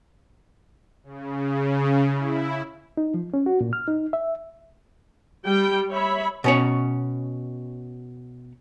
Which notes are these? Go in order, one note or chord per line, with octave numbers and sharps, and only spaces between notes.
C#3
E4
D#4
F3
C#4
F#4
A#2
F6
D#4
E5
G3 G5
C#5 E5 B5
B2 C#4 C#5